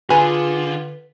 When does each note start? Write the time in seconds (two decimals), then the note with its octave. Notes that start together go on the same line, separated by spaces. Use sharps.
0.10 D3 F4 G#4 B4